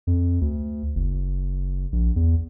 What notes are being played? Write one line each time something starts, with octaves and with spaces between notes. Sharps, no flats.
F2
D2
F#1
A#1
E2